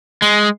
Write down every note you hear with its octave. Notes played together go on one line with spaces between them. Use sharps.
G#3